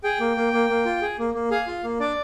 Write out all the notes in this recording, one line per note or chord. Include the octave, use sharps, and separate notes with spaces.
G#4 G5
A#3
A#3
A#3
A#3
F4
G#4
A#3
A#3
G#4 F5
F4
A#3
D4 D5